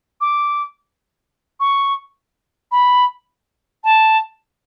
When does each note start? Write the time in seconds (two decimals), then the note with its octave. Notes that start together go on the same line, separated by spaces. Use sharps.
0.21 D6
1.60 C#6
2.72 B5
3.84 A5